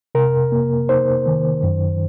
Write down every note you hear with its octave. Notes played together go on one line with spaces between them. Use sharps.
C3 A#4
A#3
D#4 C5
D#3
F#2